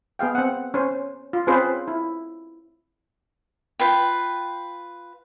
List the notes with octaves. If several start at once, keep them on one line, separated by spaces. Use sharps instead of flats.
B3 G#4 F5 G5
C4 F#5
C#4 C5
F4
C4 C#4 F4 G#4 B4 C5
E4
F4 B4 G5